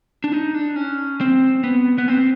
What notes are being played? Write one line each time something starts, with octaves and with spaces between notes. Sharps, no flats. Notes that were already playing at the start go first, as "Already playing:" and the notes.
D4
D#4
D4
C#4
C4
B3
B3
C4